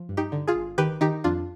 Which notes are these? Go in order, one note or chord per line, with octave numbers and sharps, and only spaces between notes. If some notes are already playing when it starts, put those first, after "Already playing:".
Already playing: F3
G2
D#4 G4
D3
F4 G#4
G1
D#3 G4 B4
D#3 D#4 G4
F2 D4 F4